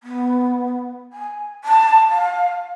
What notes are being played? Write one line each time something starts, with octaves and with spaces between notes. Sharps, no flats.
B3
G#5
A5
F5